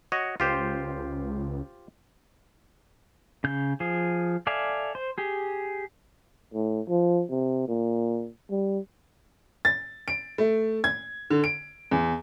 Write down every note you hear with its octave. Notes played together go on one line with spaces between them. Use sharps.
F#4 C#5 D#5
C#2 F4 G4 C5
C#3 G6
F3 G#4
A4 D5 E5 F5 G#5
C5
G4 G#4
A2
F3
C3
A#2
G3
A6
D7
A3
G#6
D3
D7
E2